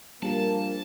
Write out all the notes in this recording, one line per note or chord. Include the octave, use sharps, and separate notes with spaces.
A#1 G3 A#3 A5